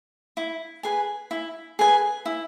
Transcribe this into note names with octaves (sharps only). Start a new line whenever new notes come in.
E4
G#4 B4 G#5
E4
G#4 B4 G#5
E4